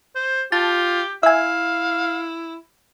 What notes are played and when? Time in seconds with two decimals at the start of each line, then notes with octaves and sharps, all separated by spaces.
0.15 C5
0.52 F4 G4 A5
1.23 E4 E5 F5 G#5